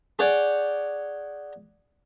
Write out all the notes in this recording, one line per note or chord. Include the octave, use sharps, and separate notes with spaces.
G#4 C#5 D5 F#5 G5